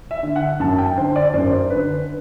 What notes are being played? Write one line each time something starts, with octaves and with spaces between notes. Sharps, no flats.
E5
D3
F#5
F#2 A5
G5
D3 C5
D5
F#2 C5
D3 B4